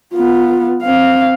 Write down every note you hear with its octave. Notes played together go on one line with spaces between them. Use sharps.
B3 F4
C4 F5